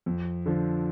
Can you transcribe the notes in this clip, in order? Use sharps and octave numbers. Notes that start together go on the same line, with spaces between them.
F2
D3 F3